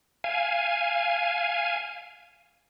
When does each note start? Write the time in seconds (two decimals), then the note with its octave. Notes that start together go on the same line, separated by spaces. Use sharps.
0.24 F5 G#5